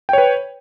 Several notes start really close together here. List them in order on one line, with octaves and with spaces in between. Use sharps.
G5 C#5 B4